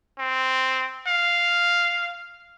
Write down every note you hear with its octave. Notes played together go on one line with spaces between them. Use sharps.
C4
F5